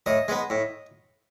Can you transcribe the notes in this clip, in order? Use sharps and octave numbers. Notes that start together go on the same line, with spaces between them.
A2 D#5
G#3 B3
A2